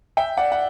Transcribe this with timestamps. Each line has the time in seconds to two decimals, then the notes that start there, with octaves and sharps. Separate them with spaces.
0.17 E5 G5
0.37 D5 F#5
0.52 F#5